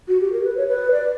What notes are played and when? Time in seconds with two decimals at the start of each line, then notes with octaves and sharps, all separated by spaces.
0.08 F#4
0.20 G4
0.32 A#4
0.44 B4
0.57 C#5
0.67 B4
0.91 D5